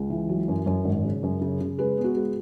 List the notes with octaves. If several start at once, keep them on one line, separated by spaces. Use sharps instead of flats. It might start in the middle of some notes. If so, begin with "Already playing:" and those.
Already playing: C#2
E3
F#3
F#2
F#2
G#1
C#3
F#2
C#3
C#3
G#3 B4
B3
F#4
G#3